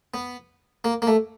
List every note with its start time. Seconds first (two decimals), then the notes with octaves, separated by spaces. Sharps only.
0.14 B3
0.84 A#3
1.02 A#3
1.07 A3